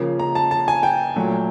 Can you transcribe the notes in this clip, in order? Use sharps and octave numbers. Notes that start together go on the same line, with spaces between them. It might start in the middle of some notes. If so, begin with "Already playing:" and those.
Already playing: C#3 F3 A#3
A#5
A5
A5
G#5
G5
A#2 F#3 A3